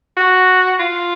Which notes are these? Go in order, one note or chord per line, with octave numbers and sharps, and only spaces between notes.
F#4
F4